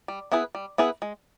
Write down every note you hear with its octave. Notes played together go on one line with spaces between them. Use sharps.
G3
B3 E4 G#4 B4
G3
B3 E4 G#4 B4
G#3